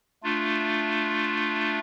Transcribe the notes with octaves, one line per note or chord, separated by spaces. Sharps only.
A3 D4 F4